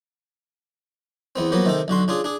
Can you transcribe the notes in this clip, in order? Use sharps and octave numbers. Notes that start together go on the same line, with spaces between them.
E2 B3 C4
F3 F#3 A#3 B3
C3 D#3 C4 A4
B1 D3 F#4 C6
C#3 D4 F4 G#4
D4 G#4